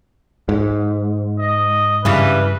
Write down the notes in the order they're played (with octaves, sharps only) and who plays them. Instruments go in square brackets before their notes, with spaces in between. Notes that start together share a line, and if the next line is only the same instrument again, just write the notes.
[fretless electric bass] G#2
[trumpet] D#5
[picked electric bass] G2 [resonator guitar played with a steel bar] C#3 E3 G3 [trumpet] B4